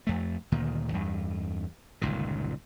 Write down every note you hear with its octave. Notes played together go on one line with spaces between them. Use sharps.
F2 A3
D2 A#2 D#3
E2 G2
G1 C#2 A#2 D#3